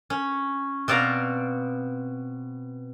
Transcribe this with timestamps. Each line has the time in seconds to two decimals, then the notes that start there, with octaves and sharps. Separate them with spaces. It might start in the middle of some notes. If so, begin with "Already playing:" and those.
0.10 C#4
0.88 B2 C4 D5 F5 A#5